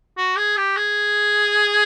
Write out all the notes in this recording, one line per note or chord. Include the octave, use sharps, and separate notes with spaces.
F#4
G#4
G4
G#4